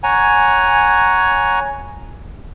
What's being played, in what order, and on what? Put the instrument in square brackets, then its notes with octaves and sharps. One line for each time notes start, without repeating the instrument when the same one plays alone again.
[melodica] C#5 F#5 G#5 A#5